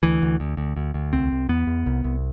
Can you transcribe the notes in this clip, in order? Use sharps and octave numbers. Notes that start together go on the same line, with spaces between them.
D2 E3
D2
D2
D2
D2
D2
C2 C4
C2
E2 B3
E2
C2
C2